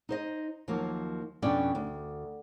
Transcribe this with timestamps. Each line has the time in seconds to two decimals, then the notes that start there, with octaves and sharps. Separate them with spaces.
0.09 D#4 C5 D#5
0.68 D#2 F3 F#3 A#3
1.42 F2 B2 C#4 D4 D5 G5
1.75 D2